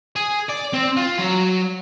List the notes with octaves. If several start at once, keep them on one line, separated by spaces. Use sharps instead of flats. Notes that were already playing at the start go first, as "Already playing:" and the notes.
G#4
D5
C4
F4
F#3